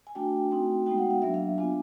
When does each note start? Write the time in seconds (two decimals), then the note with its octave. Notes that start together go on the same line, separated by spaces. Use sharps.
0.07 G#5
0.15 A3 D4 F#4 G5
0.51 A3 C4 D#4 F#4
0.86 G#3 B3 D#4 F#4 G5
0.98 F#5
1.10 F5
1.22 F#3 A#3 D4 E5
1.34 F5
1.57 B3 D4 F4 G#5